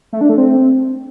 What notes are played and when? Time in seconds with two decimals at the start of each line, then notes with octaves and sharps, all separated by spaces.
0.13 A3
0.21 D4
0.29 A3
0.38 C4